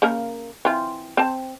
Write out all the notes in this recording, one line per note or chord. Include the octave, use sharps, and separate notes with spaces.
C#3 A#3 A#4
E3 C4 F4
C4 A5